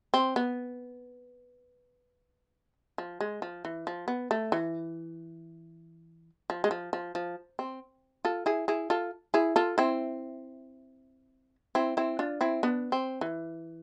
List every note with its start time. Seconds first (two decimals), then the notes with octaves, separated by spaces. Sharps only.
0.14 C4
0.36 B3
2.98 F3
3.20 G#3
3.42 F3
3.65 E3
3.87 F3
4.08 B3
4.31 A3
4.52 E3
6.50 F3
6.64 G#3
6.71 F3
6.93 F3
7.15 F3
7.59 C4
8.25 F4 A4
8.46 E4 G#4
8.68 E4 G#4
8.90 F4 A4
9.34 E4 G#4
9.56 F4 A4
9.78 C4 E4
11.75 C4 E4
11.97 C4 E4
12.19 D4 F4
12.41 C4 E4
12.63 B3 D4
12.92 C4
13.21 E3